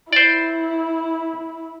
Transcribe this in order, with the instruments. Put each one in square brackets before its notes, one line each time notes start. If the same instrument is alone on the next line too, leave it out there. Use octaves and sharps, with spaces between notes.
[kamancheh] E4 [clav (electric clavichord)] C5 D5